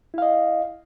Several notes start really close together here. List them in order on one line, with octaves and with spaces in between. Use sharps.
E4 F5 D#5